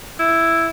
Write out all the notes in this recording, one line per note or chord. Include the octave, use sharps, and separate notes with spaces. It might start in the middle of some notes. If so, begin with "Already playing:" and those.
E4